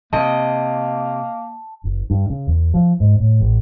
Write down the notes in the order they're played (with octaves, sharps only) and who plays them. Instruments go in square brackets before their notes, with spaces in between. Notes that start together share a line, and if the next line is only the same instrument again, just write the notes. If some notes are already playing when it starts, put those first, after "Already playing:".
[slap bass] C3 [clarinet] A#3 [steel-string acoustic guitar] D#5 [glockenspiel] A5
[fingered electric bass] F#1
G2
C#3
E2
F3
G#2
A2
A1